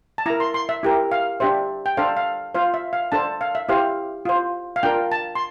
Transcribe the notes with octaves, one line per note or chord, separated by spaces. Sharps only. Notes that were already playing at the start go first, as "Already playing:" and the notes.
A5
E4 A#4 A#5
C6
C6
E5
E4 G4 A#4
F5
D4 G4 C5 E5
G5
D4 A4 C5 F5
F5
F4 C5 F5
E5
F5
D4 A4 C5 A5
F5
E5
E4 G4 C5 F5
F4 C5
F5
D4 F4 A#4 G5
A5
C6